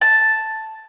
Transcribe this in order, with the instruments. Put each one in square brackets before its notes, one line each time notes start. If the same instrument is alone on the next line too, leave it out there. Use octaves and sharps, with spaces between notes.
[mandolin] A5